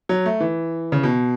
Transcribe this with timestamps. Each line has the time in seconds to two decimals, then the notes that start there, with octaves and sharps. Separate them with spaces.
0.09 F#3
0.26 A3
0.40 E3
0.92 C#3
1.03 B2